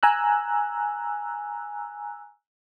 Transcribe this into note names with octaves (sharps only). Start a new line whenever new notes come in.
G#5 A#5 E6 F#6